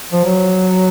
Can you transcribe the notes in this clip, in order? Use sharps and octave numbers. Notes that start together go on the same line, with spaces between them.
F3
F#3